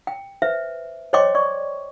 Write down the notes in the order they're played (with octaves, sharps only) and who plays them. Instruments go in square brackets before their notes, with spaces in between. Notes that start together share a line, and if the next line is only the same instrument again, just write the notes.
[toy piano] G5
B4 C5 E5
C5 C#5 D#5 G5 C6 D6
D5 C#6